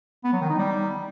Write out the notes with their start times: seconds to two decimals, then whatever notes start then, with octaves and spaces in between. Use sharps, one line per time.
0.24 B3
0.33 F#3
0.41 D#3
0.50 D#4
0.58 G3